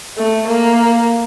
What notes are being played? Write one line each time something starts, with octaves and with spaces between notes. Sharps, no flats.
A3
A#3